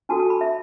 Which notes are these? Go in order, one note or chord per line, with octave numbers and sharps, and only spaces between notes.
D4 F#4 A4 A5
A5
B5
E5